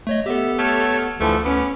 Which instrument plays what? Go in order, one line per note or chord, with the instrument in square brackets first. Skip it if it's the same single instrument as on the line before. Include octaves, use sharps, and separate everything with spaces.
[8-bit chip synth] A3 C#5 D#5
[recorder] B3 [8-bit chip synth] G4 A4 [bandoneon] E5
[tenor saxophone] A3 [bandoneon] C#5 A5 F6
[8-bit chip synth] D2 [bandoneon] D3 E3 F3 [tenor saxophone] A3
[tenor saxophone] B3 [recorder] C#4 [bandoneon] B5 D6